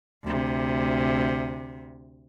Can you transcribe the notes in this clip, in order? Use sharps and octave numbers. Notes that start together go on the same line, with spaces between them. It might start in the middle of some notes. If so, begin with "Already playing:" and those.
D2 C3